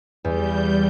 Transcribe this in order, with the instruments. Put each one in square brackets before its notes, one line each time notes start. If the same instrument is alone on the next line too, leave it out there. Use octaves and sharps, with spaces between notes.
[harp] E2 [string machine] G3 G6